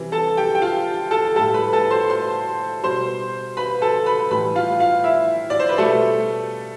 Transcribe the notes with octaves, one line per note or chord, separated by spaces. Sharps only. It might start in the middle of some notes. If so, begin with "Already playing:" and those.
Already playing: C3 E3 G3
A4 A5
G4 G5
G5
F4 F5
A4 A5
A2 G3 A4 A5
B4 B5
A4 A5
C5 C6
C5 C6
B2 G3 C5 C6
B4 B5
A4 A5
B4 B5
A2 E3 G3 B4 B5
F4 F5
F4 F5
E4 E5
D5
C5
B4
B2 G3 A3 A4